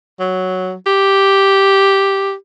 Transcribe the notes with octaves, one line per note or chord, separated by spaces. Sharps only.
F#3
G4